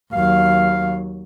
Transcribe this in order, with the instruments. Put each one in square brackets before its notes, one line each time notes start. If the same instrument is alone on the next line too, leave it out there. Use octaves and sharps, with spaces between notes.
[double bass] D#2 F#3 [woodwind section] F5